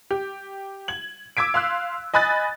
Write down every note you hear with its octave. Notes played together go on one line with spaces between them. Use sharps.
G4
G#6 F#7
D6 E6 G#6 B6 D7
F5 C6 E6 F#6
D#5 G#5 B5 F#6 A6